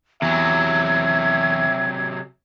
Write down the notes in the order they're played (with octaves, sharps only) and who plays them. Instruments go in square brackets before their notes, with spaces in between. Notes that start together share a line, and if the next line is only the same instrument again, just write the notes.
[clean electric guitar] E2 [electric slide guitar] C3 F#3 [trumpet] E5 [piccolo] G#6